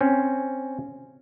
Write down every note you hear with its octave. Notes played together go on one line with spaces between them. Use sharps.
C4 C#4